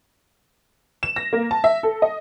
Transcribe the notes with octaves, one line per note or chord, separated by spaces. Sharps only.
E7
A#6
A#3
A5
E5
A4
D#5